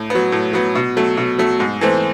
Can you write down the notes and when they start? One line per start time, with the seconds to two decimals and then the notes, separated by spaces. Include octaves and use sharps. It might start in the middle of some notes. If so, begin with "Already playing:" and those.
Already playing: A2
0.10 F#3 B3
0.32 A2
0.53 F#3 B3
0.75 B2
0.97 F#3 A3
1.17 B2
1.39 F#3 A3
1.60 G#2
1.81 E3 A3 C4